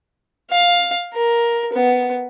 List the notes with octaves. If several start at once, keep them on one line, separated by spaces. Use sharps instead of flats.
F5
A#4
B3